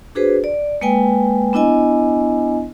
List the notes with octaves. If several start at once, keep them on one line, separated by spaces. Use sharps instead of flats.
D4 F#4 G#4 B4 C5
D5
G#3 A#3 B4 G5 G#5
B3 D4 E4 D#5 G#5